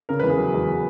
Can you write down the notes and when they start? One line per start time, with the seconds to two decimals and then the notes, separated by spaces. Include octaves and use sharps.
0.09 C#3 A#4
0.20 B4
0.23 E2
0.29 G#4
0.38 F#3
0.54 E2